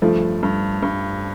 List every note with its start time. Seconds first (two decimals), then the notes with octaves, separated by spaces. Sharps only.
0.02 G2 F3 A3
0.43 G2
0.83 G2